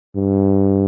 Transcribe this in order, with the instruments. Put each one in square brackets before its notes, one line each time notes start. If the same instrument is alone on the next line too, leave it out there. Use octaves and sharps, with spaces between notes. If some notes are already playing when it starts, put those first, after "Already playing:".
[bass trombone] G2